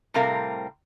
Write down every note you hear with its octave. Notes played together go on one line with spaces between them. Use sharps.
A2 C3 G3 C4 A#4 F5